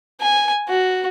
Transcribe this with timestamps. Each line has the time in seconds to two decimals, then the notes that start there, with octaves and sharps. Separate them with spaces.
0.21 G#5
0.69 F#4